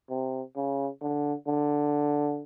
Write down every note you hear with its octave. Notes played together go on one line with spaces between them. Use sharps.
C3
C#3
D3
D3